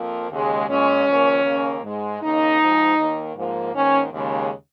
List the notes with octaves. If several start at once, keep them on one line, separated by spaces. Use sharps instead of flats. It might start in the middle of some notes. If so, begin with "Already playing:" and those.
Already playing: F2 F3 A#3
D#2 C#3 G#3
A#2 G#3 C#4
D#2 C#3 F3 A#3
D#2 C#3 A#3
G#2 G#3
D#2 C#3 A#3 D#4
G#2 F3 G#3
D#2 D#3 A#3
G#2 F3 A#3
G#2 D#3 A#3 C#4
D#2 C#3 G#3